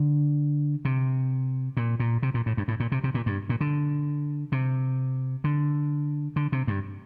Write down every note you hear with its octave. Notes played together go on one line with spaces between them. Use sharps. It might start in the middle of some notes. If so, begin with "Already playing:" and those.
Already playing: D3
C3
A#2
A#2
C3
A#2
A2
G2
A2
A#2
C3
C3
A#2
G2
A#2
D3
C3
D3
D3
C3
G2